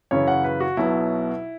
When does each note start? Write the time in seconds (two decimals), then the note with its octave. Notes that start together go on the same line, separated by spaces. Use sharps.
0.11 F#2 C#3 E3 C#4 C#5
0.28 F#5
0.44 B4
0.60 F#4
0.77 B1 B2 F#3 B3 E4